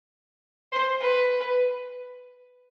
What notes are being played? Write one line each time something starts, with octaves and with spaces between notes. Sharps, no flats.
C5
B4